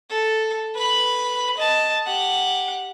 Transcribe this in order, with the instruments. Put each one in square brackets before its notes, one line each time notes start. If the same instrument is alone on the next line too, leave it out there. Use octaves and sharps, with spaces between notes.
[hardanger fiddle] A4
B4 B5
D#5 A5
G4 F#5